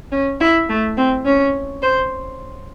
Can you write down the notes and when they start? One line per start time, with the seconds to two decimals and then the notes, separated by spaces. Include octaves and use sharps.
0.12 C#4
0.40 E4
0.69 A3
0.97 C4
1.26 C#4
1.82 C5